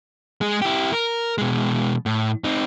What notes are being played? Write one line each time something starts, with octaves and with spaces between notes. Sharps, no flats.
G#3 G#4
E4 G4
A#4
B2 G#3
A2
C4 D#4